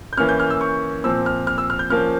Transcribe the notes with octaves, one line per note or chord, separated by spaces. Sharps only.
G6
E3 A#3 C#4 F6
G6
F6
E6
C#6
A#2 F3 C4 E6
F6
F6
E6
F6
G6
F3 A#3 C#4 F6